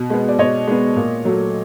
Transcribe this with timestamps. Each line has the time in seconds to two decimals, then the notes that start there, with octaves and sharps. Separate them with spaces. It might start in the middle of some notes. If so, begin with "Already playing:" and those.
Already playing: B2
0.10 G#3 B3
0.28 D5
0.39 B2 C#5 D#5
0.68 G#3 B3
0.96 A#2
1.25 F#3 A3